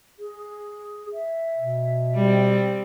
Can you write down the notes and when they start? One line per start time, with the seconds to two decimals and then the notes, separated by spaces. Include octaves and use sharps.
0.19 G#4
1.13 E5
1.57 B2
2.14 G3 C4